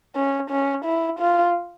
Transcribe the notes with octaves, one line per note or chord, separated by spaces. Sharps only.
C#4
C#4
E4
F4